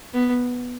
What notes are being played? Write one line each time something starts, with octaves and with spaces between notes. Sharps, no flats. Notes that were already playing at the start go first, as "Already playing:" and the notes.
B3